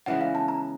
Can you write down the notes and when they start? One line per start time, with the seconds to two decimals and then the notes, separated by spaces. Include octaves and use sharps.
0.06 C#3 E3 G#3 B3 F#5
0.21 F5
0.35 A5
0.48 A#5